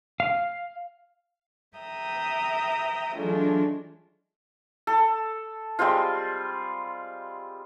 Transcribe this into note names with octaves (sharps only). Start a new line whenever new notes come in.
F5
E5 G5 A#5 D#6
E3 F#3 G#3 A3 D4 F4
A4
G3 G#3 C4 F4